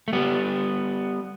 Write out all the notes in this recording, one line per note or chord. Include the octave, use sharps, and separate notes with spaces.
A3
G3 B3